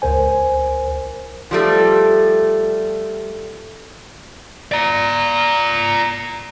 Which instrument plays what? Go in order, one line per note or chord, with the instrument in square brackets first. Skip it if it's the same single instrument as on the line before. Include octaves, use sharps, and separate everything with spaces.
[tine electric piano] C#2 A#4 C5 G#5
[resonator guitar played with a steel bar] F3 G3 A3
[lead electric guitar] D5 A#5